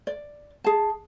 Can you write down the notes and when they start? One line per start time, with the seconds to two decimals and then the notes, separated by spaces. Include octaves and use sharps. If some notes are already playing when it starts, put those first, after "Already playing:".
0.07 D5
0.64 G#4 A5